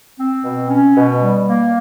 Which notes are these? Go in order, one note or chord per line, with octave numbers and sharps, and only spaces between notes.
C4
B2
C#4
B2
G3
A#3